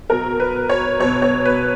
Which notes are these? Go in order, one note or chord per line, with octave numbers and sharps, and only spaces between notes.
B2 F#3 A#4
B4
C#5
B2 F#3 C#5
C#5
B4